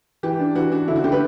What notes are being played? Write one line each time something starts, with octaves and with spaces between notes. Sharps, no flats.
E3 G4
D4
E3 F#4
D4 F#4
D3 E4
F#4
D3 G4
B4